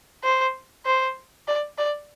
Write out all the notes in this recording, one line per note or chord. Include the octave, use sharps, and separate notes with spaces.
C5
C5
D5
D5